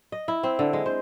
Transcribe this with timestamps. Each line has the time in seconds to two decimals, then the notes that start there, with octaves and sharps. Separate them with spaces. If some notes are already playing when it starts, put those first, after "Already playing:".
0.12 D#5
0.28 E4
0.43 C4
0.59 D3
0.73 G#3
0.86 C5